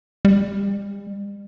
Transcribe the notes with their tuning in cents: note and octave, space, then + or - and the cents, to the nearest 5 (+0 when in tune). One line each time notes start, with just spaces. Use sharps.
G3 +40